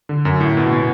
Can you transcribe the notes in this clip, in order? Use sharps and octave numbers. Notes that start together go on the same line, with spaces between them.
D3
F#2
A2
B2
B2